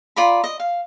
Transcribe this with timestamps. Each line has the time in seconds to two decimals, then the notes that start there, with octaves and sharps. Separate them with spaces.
0.16 F4 D5 A#5 B5
0.44 D#5
0.60 F5